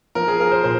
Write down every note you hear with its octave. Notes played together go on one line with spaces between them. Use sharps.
F3 A#4
G#4
F3 A#4
C5
A#2 C5